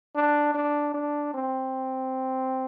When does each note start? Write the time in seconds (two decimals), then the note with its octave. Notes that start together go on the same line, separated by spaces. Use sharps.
0.15 D4
0.54 D4
0.94 D4
1.34 C4